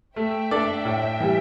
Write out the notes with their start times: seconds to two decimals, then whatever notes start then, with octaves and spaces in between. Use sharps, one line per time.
0.16 A3 E5 G5
0.51 D4 A4 D5
0.85 A2
1.20 E3 G3